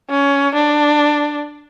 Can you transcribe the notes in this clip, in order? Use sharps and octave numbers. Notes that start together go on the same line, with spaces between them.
C#4
D4